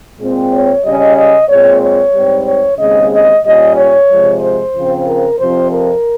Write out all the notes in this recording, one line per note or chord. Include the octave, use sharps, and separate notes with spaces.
A#2 G#3 C4
C#5
C#3 G3 C#4 D#5
D#5
A#2 G#3 C4 C#5
C#5
G#2 G3 C4
C#5
D#2 C#3 G#3 C4 D#5
D#5
A#2 G3 C#4 D#5
C#5
C3 F3 G#3
C5
C#3 F3 C4
A#4
F2 C3 F3 C4 C5
A#4